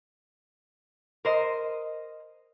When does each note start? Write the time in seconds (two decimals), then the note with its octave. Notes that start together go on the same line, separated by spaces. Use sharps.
1.25 A#4 C5 D#5